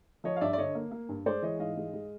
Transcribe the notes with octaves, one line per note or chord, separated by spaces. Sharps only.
F3 C#5 D#5
F5
G2 D5 E5
D5
D3 C#5 D#5
A#3
A#3
G2
G#3 C5 D5
E3 C#5 D#5
G#2 D#5 F5
G#3
G#3